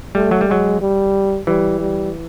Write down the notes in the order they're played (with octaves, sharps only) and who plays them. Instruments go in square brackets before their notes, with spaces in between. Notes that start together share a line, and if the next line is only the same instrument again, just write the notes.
[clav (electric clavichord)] G3 [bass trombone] A3
[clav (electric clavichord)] F#3
G3
[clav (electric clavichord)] F#3 [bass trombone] G#3
[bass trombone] G3
[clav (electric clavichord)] E3 [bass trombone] G3
[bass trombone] G3